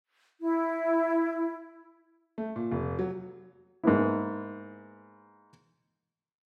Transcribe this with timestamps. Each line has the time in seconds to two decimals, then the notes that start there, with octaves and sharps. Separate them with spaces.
0.40 E4
2.38 A3
2.56 A#2
2.71 F1
2.99 F#3
3.84 G#2 A#3 B3 E4